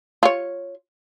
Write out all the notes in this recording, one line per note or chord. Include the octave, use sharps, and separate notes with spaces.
F4 C#5